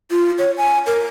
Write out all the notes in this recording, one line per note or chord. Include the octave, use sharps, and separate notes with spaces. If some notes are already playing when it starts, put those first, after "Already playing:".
F4
C#5
G#5
A#4